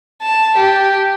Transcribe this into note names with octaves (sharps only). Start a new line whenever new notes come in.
A5
G4